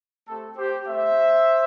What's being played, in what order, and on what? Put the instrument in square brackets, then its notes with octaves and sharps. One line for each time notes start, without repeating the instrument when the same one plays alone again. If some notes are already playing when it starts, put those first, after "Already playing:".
[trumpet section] A3 C4 G4 A4
G4 C5
A3 C4 G4 C5 E5